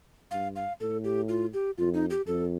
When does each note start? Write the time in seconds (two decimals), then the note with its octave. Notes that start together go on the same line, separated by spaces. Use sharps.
0.31 G2 F5
0.56 F5
0.80 A2 A4
1.04 G4
1.29 F4
1.54 G4
1.78 F2 F4
1.94 D#4
2.10 G4
2.27 F2 A4